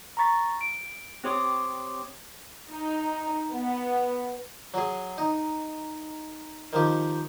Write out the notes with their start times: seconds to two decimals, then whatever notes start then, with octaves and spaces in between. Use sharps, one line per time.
0.17 A#5 B5 C#6 A6 B6
0.61 D7
1.24 C4 G4 C#5 C6 D6 D#6
2.71 D#4
3.51 B3
4.74 F#3 G#4
5.18 D#4
6.73 D#3 F3 G4